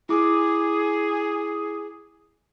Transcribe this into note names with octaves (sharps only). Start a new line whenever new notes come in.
E4 G#4 D6